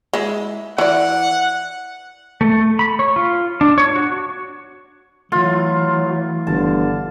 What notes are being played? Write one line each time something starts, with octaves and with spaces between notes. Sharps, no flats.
G#3 E4
E3 D5 F#5
A3
B5
C#5
F4
D4
C#5
F#4
E3 F#3 A3 F4
G1 D3 A5